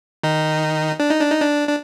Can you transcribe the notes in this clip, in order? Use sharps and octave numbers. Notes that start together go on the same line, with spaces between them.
D#3 D#4
D4
D#4
D4
D#4
D4
D4